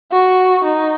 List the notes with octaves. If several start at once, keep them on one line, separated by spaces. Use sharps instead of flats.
F#4
D#4